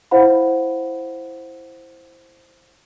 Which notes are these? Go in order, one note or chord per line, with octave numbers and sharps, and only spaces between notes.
E4 C5 F5 F#5 B5